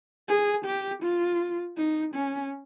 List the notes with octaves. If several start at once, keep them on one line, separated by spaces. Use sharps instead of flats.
G#4
G4
F4
D#4
C#4